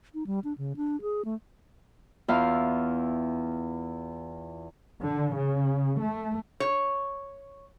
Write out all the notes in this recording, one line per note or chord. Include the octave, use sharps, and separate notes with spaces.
D#4
G3
D4
C#3
D4
G#4
A3
E2 E4 F4 F5
D3
C#3
A3
C#5